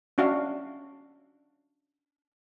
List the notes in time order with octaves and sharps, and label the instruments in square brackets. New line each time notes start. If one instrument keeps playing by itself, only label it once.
[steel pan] C#4 D4 F#4 E5 F5